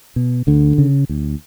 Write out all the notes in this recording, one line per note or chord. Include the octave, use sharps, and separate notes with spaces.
B2
D2 D3
C#3
D2